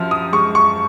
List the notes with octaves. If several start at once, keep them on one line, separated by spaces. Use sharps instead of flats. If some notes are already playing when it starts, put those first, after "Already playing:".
Already playing: F#2 F3 F6
D#6
G#3 C#6
C#6